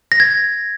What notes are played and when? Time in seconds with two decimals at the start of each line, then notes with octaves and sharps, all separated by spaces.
0.12 A#6
0.20 G#6